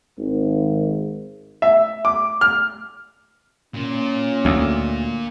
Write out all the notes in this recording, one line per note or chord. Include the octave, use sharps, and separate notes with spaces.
G#1
E5
D6
F6
A#2 C#4
D2